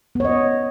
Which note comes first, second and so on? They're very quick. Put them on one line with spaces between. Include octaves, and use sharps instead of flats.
B3 C#5 D#5